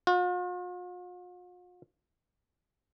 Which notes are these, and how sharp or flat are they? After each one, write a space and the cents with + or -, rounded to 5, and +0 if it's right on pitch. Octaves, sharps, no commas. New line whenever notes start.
F4 +45